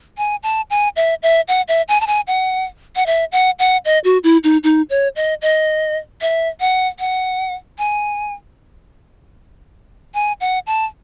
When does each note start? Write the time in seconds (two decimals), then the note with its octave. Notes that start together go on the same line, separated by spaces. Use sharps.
0.18 G#5
0.43 A5
0.70 G#5
0.96 E5
1.23 E5
1.48 F#5
1.68 E5
1.89 G#5
2.01 A5
2.07 G#5
2.27 F#5
2.96 F#5
3.06 E5
3.32 F#5
3.59 F#5
3.85 D#5
4.04 F#4
4.24 E4
4.44 D#4
4.64 D#4
4.90 C#5
5.16 D#5
5.42 D#5
6.21 E5
6.60 F#5
6.99 F#5
7.78 G#5
10.14 G#5
10.41 F#5
10.67 A5